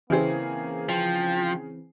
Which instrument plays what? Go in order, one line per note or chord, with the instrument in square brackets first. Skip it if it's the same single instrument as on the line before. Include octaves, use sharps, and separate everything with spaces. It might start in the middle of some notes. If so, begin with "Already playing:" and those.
[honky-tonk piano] C#3 G#4 [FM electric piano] E3 C4 [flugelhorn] A#3
[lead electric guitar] F3 [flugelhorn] G5